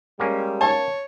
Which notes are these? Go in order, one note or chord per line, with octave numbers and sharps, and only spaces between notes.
G3 G#3 A#3 C#4
C#5 A5